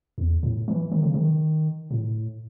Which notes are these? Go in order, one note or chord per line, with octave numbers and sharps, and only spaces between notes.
E2
A2
E3
D#3
C#3
D#3
A2